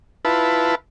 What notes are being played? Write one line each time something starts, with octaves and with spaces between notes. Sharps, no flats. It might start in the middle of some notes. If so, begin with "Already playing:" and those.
E4 F4 B4 A5